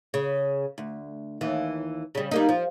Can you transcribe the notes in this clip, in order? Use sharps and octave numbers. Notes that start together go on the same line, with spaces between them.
C#3
D2
D#2 E3
C#3 G3
G3 A#3 D#4
F3